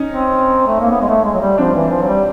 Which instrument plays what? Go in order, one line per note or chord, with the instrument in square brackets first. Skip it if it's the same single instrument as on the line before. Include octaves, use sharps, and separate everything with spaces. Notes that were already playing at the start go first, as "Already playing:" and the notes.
Already playing: [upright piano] C#4 D#4
[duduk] C4
A3
A#3
B3
G#3
A3
G#3
F#3
G3
[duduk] F3 [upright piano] C4 D4
[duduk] E3
F3
F#3
G3